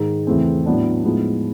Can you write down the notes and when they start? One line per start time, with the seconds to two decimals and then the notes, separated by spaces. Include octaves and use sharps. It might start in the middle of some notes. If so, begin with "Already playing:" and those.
Already playing: G#2 D#3 G#3
0.27 E2 C#3 E3 A3 C4
0.66 A2 F#3 B3 D4
1.04 A2 F3 G#3 B3 D#4